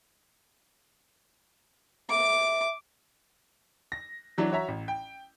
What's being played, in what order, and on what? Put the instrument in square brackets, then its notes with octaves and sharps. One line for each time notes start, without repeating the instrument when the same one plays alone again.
[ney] E5 [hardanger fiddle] D6
[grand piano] A#6
E3 F#3 D4 E4
F#4 C#5 E5 A#5
A1
G5